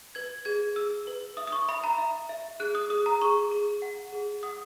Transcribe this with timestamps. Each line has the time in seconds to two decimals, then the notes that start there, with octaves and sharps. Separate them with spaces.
0.15 B4 G#6
0.45 G#4 G#6
0.76 G#4 E6
1.07 B4
1.37 E5 D#6
1.47 D#6
1.52 C#6
1.68 E5 B5
1.84 A#5
1.98 E5
2.29 E5
2.60 G#4 F#6
2.75 D#6
2.90 G#4 D#6
3.06 A#5
3.21 G#4 C#6
3.51 G#4
3.82 F#5
4.12 G#4
4.43 F#5 D#6